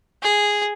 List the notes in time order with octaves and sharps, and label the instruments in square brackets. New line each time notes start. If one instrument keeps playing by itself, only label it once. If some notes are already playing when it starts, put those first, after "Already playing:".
[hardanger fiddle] G#4